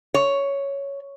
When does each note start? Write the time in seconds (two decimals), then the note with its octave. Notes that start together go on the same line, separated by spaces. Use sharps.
0.14 C#5